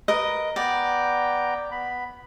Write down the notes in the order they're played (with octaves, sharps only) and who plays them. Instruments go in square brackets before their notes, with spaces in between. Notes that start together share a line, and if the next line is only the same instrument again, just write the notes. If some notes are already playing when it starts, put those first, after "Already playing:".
[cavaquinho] A#4 B4 D#5
[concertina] B3 G5 A#5 [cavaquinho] D5
[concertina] B3 B5